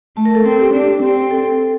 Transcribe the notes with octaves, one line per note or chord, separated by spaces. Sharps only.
A3 A5
A#4
A4
C4 A4
G4
D4
C4
A4